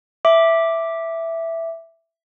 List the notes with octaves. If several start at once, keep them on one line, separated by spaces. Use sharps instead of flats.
E5 D6